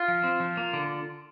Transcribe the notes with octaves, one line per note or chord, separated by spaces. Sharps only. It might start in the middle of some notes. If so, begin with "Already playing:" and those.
Already playing: F4
F3
C4
F3
A#3
D3